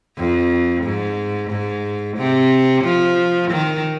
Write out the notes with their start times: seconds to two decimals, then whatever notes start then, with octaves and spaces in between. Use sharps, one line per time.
0.17 F2
0.84 G#2
1.51 G#2
2.17 C3
2.84 F3
3.51 D#3